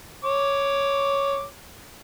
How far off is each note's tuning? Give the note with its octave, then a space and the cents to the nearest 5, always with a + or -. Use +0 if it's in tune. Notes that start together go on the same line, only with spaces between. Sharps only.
C#5 +0 D6 -5